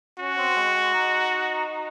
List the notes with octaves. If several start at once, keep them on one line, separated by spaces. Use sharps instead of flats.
C#4 F#4
C4
G#3
G#3
D#4